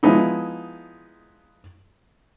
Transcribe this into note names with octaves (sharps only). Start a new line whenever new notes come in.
F3 G#3 B3 D#4 E4